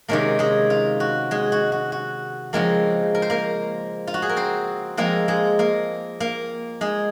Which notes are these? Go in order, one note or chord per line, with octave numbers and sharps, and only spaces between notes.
C3 D#3 G#3 A#3 C#4 A#4
G#3 G#4
F4
F#4
G#3 G#4
F#4
F#4
F#4
C#3 F3 G#3 A#3 C4 A#4
A#4
C5
A#3 A#4
F4
F#4
G#4
A#4
C4 C5
F3 G#3 A#3 C4 F4 A#4
G#3 G#4
A#3 A#4
A#3 A#4
G#3 G#4